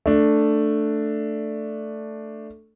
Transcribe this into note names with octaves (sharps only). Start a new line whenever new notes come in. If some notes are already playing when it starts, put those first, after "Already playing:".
A3 D4